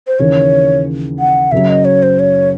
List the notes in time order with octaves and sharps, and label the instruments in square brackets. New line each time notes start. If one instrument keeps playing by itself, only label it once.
[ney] C5
[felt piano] D#2 C#3 E3 [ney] C#5
[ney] F#5
[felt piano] F#1 F#2 C#3 F#3 [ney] E5
[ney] D#5
C#5
C5
C#5